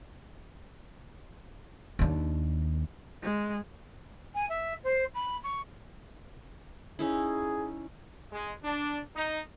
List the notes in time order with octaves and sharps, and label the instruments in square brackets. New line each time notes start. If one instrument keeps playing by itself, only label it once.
[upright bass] D#2 D4
[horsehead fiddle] G#3
[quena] G#5
E5
C5
B5
C#6
[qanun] C#4 D#4 E4 [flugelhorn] G#4
[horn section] G#3
D4
D#4